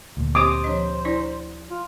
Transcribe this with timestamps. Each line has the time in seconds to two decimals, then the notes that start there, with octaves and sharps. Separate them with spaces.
0.17 D2 A#2
0.35 C4 G4 C5 D6 D#6
0.64 F3 D4 D#5
1.05 D4 E4 D5
1.71 F4